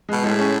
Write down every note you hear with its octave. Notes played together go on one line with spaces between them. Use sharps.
B2 G#3
A2 G#3
C#4